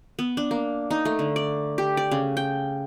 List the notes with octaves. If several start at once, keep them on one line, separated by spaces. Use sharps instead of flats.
B3
D4
A#3
D#4
A3
D3
D5
G4
D5
C#3
G5